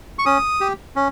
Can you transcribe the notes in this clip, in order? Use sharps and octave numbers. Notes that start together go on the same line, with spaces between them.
C#6
C#4 D#6
G4
C#4